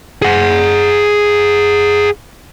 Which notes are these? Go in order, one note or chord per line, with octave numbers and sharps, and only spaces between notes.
G#4 F#5